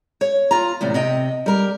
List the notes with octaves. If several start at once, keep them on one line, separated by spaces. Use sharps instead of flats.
C#5
F4 A#5
E2 A2 C3
C3 D#5 G5
G3 A#4